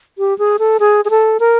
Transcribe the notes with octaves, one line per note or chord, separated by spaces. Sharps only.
G4
G#4
A4
G#4
G#4
A4
A#4